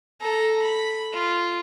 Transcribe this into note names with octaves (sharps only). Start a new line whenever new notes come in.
A4 A#5
B5
F4